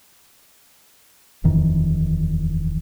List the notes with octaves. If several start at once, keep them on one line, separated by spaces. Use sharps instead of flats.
D#1 F2 D#3 E3